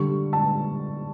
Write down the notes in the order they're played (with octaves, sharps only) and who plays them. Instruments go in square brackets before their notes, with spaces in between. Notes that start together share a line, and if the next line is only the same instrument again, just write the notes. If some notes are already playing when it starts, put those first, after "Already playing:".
Already playing: [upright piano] D3 G3 D4 C#6
A5